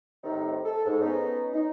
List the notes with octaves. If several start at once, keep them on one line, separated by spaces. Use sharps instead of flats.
A2 D#3 G3 A3 C4 D#4
A4
G#2
B3 C#4 D#4
D#4